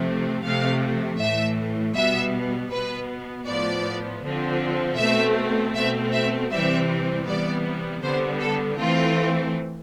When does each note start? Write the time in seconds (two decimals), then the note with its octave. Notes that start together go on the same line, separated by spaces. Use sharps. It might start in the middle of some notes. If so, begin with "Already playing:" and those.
Already playing: C3 F3 A3 C4
0.44 C3 F3 A3 F5
1.20 A2 E3 A3 E5
1.95 B2 G3 B3 E5
2.71 B2 B3 B4
3.47 A2 F3 B3 D5
4.23 D3 F3 C4
4.99 B2 A3 C4 E5
5.75 B2 A3 C4 E5
6.13 E5
6.51 C3 E3 G3 C4 E5
7.27 C3 E3 G3 B3 D5
8.02 D3 G3 B3 C5
8.40 A4
8.78 E3 A3 C4 F4